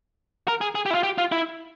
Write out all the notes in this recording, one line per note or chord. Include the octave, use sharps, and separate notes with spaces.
A#4
G#4
G#4
G4
E4
F4
G4
F4
E4